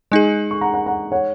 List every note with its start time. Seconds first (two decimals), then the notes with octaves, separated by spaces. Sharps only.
0.11 G#3 D#4 G#4 D#5 G#5
0.51 C#6
0.61 F#5 A#5
0.74 F#5 A#5
0.86 F#5 A#5
1.12 C#5 F#5